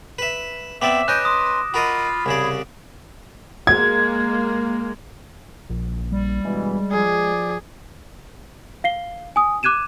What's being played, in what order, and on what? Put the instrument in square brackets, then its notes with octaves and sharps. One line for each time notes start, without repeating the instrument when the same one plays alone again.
[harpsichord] B4 E5
[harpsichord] B3 C4 D5 [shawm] E5 [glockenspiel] D6 E7
[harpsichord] C#4 D#5 [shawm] B4 [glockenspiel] F#6 A#6 D7 [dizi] G6
[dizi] C6 [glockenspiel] D#6
[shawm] F4 [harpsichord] F#4 A#4 D#5 [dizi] B5
[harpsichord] C2 C#3 D5 [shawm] G#4
[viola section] G#3 A#3 [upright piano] G#6
[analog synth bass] A#1
[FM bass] G3
[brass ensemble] G2 B2 E3 [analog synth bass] G#3
[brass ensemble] F3 D5 [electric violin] G#4
[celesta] F5 C7 G7
G#5 D#6
D6 F#6 G#6 D#7 E7